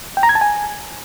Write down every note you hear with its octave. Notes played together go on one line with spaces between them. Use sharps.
G5
A#5
G#6
A5
G#5